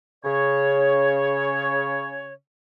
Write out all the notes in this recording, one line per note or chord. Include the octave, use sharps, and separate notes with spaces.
C#3 C#5